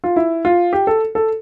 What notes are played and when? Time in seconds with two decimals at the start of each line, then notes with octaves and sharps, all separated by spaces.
0.04 F4
0.16 E4
0.45 F4
0.73 G4
0.87 A4
1.15 A4